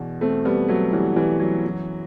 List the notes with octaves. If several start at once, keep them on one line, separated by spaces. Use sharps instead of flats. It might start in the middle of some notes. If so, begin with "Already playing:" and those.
Already playing: E2 B2
A3 C4
G3 B3
F#3 A3
E3 G3
E3 G3
F#3
F#2 E3